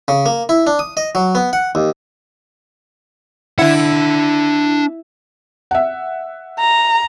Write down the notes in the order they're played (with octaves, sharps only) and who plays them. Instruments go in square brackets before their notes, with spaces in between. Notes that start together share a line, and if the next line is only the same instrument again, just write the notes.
[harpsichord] C#3
A#3
E4
D4
D#6
D#5
F#3
B3
F#5
D#2
[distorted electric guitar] D4 F#5 [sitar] E4
[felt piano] E5 F#5
[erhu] A#5